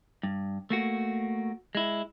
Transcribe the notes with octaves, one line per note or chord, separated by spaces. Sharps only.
G2
A3 A#3 F#4
G#3 E4